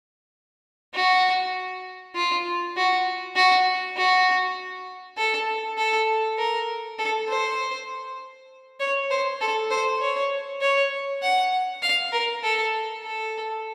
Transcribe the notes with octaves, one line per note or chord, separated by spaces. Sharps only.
F#4
F4
F#4
F#4
F#4
A4
A4
A#4
A4
C5
C#5
C5
A4
C5
C#5
C#5
F#5
F5
A#4
A4
A4